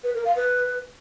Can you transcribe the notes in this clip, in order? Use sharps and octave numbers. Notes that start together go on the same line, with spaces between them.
B4
A#4
F5
B4